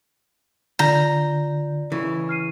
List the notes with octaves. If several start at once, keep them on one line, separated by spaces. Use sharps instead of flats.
D3 F4 D5 A#5 G6
C#3 E3
F6 C7 D#7